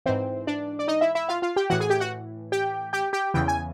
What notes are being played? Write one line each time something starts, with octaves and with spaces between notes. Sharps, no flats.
G#2 E3 C4 C5
D4 D5
D5
D#4 D#5
E4 E5
E4 E5
F4 F5
F4 F5
G4 G5
A2 E3 F#4 F#5
G#4 G#5
G4 G5
F#4 F#5
G4 G5
G4 G5
G4 G5
E2 C#3 E3 G5
G#5